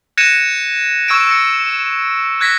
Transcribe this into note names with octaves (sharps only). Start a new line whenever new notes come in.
F#6 G#6 A#6 C#7 D#7 E7
C#6 E6 G#6 C#7 D7
E6 A#6 C#7
F#6 G#6 A#6 B6